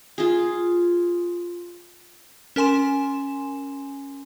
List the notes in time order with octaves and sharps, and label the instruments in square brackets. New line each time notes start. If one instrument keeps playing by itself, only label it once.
[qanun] F4 G#4
[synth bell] C#4 A#4 G#5 C6 E7